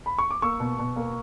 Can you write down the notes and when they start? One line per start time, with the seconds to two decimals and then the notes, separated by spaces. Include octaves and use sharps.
0.06 B5
0.18 C#6
0.31 D6
0.42 A#3 C#6 E6
0.60 B2
0.79 B2
0.96 A#3